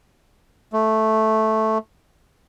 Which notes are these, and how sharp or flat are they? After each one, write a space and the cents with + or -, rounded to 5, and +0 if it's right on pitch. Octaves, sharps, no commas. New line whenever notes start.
A3 -5